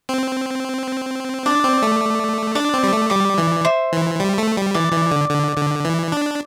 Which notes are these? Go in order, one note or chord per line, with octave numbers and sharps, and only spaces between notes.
C4
D4 D5
C4
A3
D4 D5
C4
G3
A3
G3 D5
E3
C5 E5
E3
G3
A3
G3
E3 D5
E3
D3
D3
D3
E3
D4